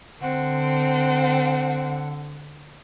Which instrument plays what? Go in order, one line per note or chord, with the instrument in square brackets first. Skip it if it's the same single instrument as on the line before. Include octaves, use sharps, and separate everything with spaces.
[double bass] D3 [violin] C4 [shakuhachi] F#5